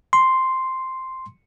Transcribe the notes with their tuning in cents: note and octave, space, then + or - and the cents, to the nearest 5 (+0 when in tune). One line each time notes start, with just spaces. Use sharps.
C6 +0